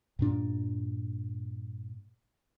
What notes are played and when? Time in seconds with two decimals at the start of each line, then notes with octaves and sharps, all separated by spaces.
0.19 G2 A#2 D4